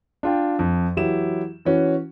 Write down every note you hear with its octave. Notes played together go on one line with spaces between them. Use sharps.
D4 F4 G5
F2
E3 F#3 E4 G4 E7
E3 C#4 F#4